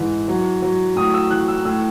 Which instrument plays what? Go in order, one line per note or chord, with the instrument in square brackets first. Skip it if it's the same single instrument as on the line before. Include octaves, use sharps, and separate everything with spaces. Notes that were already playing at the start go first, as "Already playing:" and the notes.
Already playing: [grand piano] G#2 E3
F#3
F#3
A2 D#6
E6
E3 F#6
E6
A2 E6